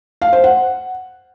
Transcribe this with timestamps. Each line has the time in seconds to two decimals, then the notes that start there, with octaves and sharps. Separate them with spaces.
0.22 F5
0.33 C5
0.44 F#5